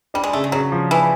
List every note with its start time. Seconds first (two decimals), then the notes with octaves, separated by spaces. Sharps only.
0.14 G3 D4
0.24 G#3
0.33 C#3 A3
0.44 G#3
0.52 C#3 F#3
0.72 F3
0.91 E3